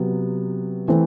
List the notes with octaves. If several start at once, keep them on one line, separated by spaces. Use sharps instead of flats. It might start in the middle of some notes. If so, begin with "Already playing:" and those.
Already playing: C3 F#3 B3
E3 A3 C4